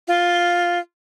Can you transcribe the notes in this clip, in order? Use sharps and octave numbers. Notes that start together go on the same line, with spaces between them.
F4